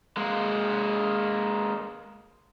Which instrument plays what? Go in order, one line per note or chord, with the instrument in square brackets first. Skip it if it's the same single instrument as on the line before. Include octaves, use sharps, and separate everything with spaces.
[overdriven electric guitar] G#3 A#3